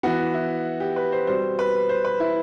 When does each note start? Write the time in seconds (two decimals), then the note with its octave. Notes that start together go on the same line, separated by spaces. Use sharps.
0.03 E3 B3 F#4
0.34 E4
0.80 G4
0.96 B4
1.12 C5
1.27 B2 G3 C4 C5
1.59 B4
1.89 C5
2.05 B4
2.20 E4